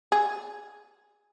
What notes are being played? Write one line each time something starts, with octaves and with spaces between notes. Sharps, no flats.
G#4